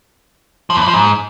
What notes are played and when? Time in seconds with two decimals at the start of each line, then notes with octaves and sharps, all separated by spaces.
0.70 F3
0.76 E2
0.82 E3
0.88 F3
0.93 G#2